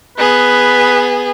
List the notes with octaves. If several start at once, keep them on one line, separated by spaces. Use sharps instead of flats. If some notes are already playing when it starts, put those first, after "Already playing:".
B3 G#4 B4